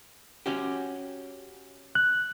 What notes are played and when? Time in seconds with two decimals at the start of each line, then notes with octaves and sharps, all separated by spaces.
0.46 C#4 F#4 G4
1.95 F#6